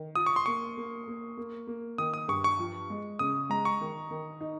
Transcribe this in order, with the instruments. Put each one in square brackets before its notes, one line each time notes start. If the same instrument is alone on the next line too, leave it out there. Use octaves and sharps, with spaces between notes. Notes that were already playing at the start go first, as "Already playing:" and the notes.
Already playing: [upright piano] D#3
[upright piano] F4 [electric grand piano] D#6
[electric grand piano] C#6
C6
[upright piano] A#3 [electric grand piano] C#6
[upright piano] A#3
A#3
A#3
A#3
[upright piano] D#3 [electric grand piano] D#6
[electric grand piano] D#6
[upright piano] G2 [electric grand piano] C#6
[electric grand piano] C#6
[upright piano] F3
G#3
[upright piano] C#3 [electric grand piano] D#6
[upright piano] G#3 [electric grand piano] A#5
[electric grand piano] C#6
[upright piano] D#3
D#3
D#4